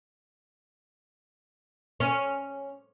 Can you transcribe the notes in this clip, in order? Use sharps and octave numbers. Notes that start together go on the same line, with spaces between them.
C#4